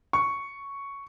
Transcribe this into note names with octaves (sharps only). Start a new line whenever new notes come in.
C#6